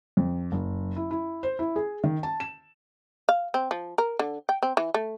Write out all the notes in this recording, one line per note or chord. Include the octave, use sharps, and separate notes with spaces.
F2
F#1
E4
E4
C5
E4
G#4
D#3
A5
E7
F5
C4
F3
A#4
D3
G5
C4
E3
A3